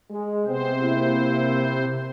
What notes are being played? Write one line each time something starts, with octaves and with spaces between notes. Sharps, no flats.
G#3
C3 G#3 B3 C4 C5
A#3 E4